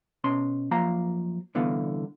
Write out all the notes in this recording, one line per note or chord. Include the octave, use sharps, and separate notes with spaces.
B2 C#4 C6
F#2 F3 A#3 F5 A#5
C2 D3 E3 B3 F5